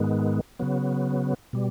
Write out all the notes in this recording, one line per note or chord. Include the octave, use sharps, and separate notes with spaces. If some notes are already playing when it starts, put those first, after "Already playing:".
Already playing: G#2 D#3 G#3 B3
C#3 F#3 B3
B2 G3